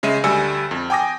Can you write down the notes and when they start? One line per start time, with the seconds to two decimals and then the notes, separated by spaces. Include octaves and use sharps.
0.03 C#3 G#3 E5 D#7
0.24 D2 G3 G#5 E6 C#7
0.71 F2
0.90 G5 G#5 D6 D#6 A#6